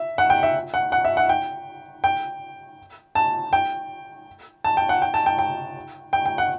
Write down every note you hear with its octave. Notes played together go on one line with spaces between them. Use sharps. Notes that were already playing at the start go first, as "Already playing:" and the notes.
Already playing: E5
F#5
G5
E5
F#5
F#5
E5
F#5
G5
G5
A5
G5
A5
G5
F#5
G5
A5
G5
G5
G5
G5
F#5